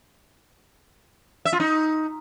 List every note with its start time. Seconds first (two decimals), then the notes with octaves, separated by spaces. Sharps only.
1.45 E5
1.53 F4
1.60 D#4